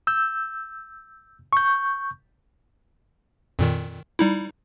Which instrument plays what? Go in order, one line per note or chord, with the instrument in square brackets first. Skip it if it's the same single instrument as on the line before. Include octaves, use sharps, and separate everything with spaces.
[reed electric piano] E6 G6
C#6 G6
[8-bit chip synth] F2 A#2 D#3
G3 D#4 E4